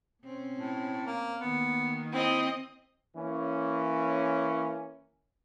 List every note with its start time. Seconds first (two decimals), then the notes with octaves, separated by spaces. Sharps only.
0.23 B2 C4 C#4
0.56 A2
1.06 A#3
1.41 D#3 A#3 B3
2.13 C4 E4 D#5
3.16 E3 A#3 C#4